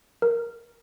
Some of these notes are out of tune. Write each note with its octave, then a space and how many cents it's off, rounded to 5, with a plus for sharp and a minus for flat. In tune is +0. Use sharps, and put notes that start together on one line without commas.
A#4 +5